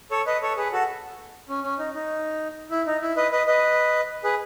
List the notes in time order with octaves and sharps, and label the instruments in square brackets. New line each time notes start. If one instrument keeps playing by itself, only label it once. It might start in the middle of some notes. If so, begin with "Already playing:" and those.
[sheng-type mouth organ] A4 C#5
B4 D#5
A4 C#5
G#4 B4
F#4 A4
C#4
C#4
D#4
D#4
E4
D#4
E4
B4 D#5
B4 D#5
B4 D#5
G#4 B4